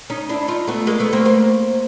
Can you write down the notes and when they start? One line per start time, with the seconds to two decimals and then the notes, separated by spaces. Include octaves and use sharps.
0.10 C#4 D#4
0.29 D4 E4
0.48 D#4 F4
0.67 A3 B3
0.87 G#3 A#3
1.00 A3 B3
1.13 A#3 C4
1.25 A#3 C4